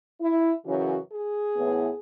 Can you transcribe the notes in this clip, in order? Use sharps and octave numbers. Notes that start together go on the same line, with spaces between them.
E4
F#2 C#3 E3 F#4
G#4
A2 E3 B3